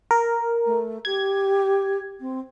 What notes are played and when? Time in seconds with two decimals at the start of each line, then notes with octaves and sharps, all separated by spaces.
0.11 A#4
0.65 A3
1.05 G4 G#6
2.20 C4